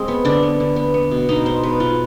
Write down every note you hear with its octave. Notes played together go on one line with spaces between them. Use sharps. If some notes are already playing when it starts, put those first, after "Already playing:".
Already playing: G#3 C4 G#4
B3
D3 D4
B3
D3
B3
B3
B2
B2 D#4
G#3 C5
B3 B4
B2 F4